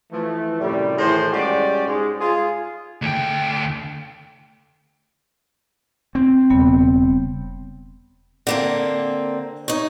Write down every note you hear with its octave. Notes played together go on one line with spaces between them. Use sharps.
E3 F3 A3
F#2 A2 C3 G3
A2 D#3 E3 G#4 C5
G3 G#3 C#4 F#4 G4 D5
G#2 G#3
F4 G#4
D2 G5
C4
E1 C#3 G3 B3
D3 A#3 C4
D#4 C#5